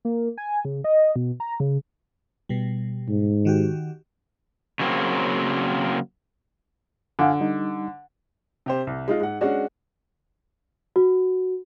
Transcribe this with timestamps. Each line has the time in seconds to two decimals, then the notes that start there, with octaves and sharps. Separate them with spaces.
0.05 A#3
0.38 G#5
0.65 C#3
0.84 D#5
1.16 B2
1.40 A#5
1.60 C#3
2.49 B2 G3
3.09 G#2
3.45 D#3 F#4 G4
4.80 C#3 F#3 A#3 C4
7.19 D3 F5 F#5 G#5
7.40 G3 D#4
8.66 C3 G4 C5
8.87 C2
9.08 G#3 D#4 F4
9.20 G#2 F#5
9.41 G#3 C#4 D4 F#4
10.96 F#4